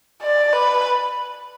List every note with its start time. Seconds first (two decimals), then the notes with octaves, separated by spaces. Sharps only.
0.23 D5
0.53 B4